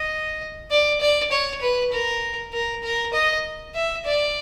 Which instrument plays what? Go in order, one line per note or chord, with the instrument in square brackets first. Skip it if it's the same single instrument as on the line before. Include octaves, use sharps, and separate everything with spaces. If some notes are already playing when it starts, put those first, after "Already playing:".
Already playing: [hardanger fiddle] D#5
D5
D5
C#5
B4
A#4
A#4
A#4
D#5
E5
D5